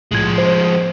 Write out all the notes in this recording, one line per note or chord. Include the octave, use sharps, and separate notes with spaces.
C2 A2 F3 G#3 G#6
C5